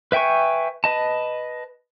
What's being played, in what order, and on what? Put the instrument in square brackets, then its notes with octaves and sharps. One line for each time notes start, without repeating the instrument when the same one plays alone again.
[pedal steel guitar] B4 E5 G5 G#5 C#6
B4 D#5 A5